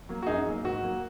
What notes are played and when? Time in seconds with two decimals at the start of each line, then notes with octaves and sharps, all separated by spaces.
0.09 F#3 A#3
0.23 F#4
0.27 F#2 D#4 G#4
0.46 F#3 A#3
0.64 G#2 F#4
0.83 F#3 A#3